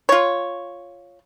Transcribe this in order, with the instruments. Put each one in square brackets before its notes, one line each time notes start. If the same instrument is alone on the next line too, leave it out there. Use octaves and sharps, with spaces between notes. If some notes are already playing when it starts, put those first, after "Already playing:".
[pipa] F4 C#5